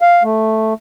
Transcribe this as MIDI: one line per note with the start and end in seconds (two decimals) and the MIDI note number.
0.01 0.23 77
0.24 0.74 57